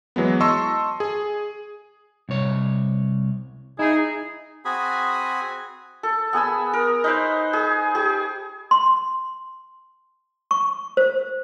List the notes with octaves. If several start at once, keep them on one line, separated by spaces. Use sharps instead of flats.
E3 F#3 G#3 B3
D#5 A5 C6 C#6 E6
G#4
C2 C#5
D#4 E4 G#4
C4 F#4 G#4 G#5 B5 D#6
A4
B3 G#4 G#5 E6
A#4
D#4 B4 C5
G#4
G4 G#4
C6
C#6
C5